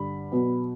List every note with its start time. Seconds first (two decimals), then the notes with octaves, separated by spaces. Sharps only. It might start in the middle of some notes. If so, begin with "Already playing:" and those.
Already playing: G2 D3 G3 B5
0.32 B2 F#3 B3